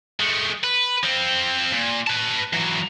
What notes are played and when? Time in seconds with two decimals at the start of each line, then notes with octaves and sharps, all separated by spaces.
0.20 G#3 A3
0.64 B4
1.04 F3 C4
1.72 A#2
2.07 B4 A5
2.53 E3 F#3